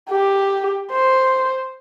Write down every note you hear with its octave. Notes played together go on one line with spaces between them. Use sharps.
G4
C5